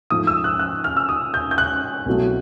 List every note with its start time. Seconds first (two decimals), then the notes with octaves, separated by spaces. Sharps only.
0.10 G#2 F3 A3 D#6
0.27 E6
0.44 F#6
0.59 F#6
0.84 F6
0.97 E6
1.09 D#6
1.34 G6
1.51 G6
1.58 F#6
2.06 C2 B2 F#3 A3